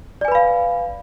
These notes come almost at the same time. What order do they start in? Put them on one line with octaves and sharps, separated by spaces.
D5 G#5 B4 B5 F5